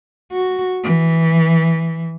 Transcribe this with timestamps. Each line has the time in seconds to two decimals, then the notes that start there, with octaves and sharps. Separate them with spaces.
0.32 F#4
0.84 E3